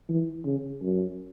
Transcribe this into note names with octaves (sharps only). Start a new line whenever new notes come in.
E3
C#3
F#2